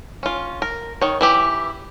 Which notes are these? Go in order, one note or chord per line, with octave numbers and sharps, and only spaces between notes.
C#4 F4
A#4
D#3 C#5
E3 E4 G4